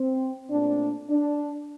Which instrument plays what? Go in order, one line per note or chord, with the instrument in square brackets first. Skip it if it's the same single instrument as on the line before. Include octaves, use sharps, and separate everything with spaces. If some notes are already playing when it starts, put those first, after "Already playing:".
Already playing: [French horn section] C4
A#2 A3 C4 D4
D4